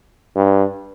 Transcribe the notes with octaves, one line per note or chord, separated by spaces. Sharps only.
G2